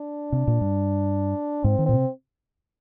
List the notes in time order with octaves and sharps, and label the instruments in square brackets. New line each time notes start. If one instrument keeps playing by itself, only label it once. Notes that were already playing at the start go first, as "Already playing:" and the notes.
Already playing: [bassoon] D4
[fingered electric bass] C3
A#2
G2
[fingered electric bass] G#2 [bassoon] C4
[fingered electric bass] D#3
[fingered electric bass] A#2 [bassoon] C4
[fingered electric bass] C3